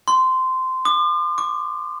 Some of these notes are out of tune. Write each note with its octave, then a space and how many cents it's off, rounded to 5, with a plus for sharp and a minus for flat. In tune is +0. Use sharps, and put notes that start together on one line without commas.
C6 -15
D6 +45
D6 -40